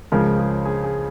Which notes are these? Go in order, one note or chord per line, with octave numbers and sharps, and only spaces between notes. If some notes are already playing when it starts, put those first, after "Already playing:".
C#2 C#3 F3 G#3 A#4
G#4
G#4
G#4